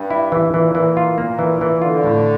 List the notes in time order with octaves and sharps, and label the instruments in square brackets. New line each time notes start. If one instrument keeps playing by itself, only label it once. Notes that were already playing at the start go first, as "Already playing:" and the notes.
Already playing: [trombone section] G2
[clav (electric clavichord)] E4
E3
[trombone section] A#2 [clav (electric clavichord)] E3
[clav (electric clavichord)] E3
F4
[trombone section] A#2 [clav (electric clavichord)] A#3
[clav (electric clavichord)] E3
E3
[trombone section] D3 [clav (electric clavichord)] F4
[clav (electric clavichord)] A2